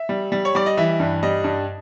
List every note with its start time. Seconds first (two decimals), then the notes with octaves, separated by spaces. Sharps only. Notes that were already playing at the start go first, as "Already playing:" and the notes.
Already playing: E5
0.09 G3
0.32 G3
0.45 C#5
0.55 G3 D5
0.66 D#5
0.77 E3 E5
1.00 G2
1.23 G3 D#5
1.44 G2